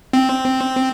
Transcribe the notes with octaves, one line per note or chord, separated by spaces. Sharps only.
C4